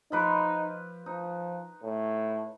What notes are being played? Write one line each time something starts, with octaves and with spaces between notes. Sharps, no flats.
F3 D#4 B4 D6
F3 D#4
A2